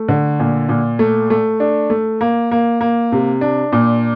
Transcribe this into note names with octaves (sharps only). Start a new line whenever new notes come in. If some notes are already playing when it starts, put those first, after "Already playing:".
Already playing: A3
D3
A#2
A#2
A3
A3
D4
A3
A#3
A#3
A#3
C3
D4
A#2